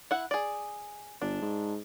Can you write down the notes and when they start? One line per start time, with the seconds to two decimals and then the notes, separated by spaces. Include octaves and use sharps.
0.11 E4 F#5
0.31 G#4 D5
1.22 G1 D4
1.42 G#2